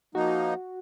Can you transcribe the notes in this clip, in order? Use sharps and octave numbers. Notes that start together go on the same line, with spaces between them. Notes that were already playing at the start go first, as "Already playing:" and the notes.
F3 A#3 D#4 F#4